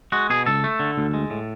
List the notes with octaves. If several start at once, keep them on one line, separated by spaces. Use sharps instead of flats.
G#3 F#4
B2 G#4
C#2 A4
A3
D3
D2
G#3
A2